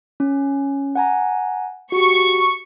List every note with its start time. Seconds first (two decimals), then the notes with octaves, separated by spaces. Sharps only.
0.20 C#4
0.95 F#5 G#5 A#5
1.92 F#4 G4 C#6